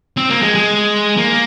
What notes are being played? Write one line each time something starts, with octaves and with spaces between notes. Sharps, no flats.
C4
A#3
G#3
G#3
A#3